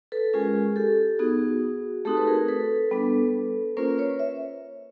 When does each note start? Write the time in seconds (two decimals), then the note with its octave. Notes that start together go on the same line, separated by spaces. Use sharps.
0.12 A4 B4
0.33 G#3 C#4 F4 G#4 A#4
0.76 G4 A4
1.19 B3 D#4 F#4 G#4
2.05 A3 C4 D#4 F#4 G4 A4
2.17 B4
2.27 G#4 A#4
2.48 A4 B4
2.91 G3 B3 D4
3.77 A#3 C#4 F4 A#4 C5
3.98 B4 C#5
4.19 E5